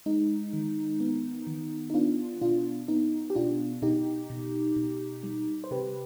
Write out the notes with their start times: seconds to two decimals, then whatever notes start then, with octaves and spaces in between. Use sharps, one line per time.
0.06 G#3 D#4
0.53 D#3
1.00 B3
1.47 D#3
1.90 D#4
1.94 B3 D4 F4
2.41 B2 D4 F4
2.88 B3 D#4
3.30 G4
3.35 B2 D4 F4
3.82 B2 D#4 G4
4.30 B2
4.76 B2
5.23 G3
5.64 C5
5.71 C3 G4 B4